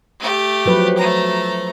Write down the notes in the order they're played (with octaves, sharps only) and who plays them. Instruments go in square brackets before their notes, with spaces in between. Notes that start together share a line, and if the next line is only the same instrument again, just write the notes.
[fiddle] A3 G4
[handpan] F3 F#3 B4
[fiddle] A3 A#5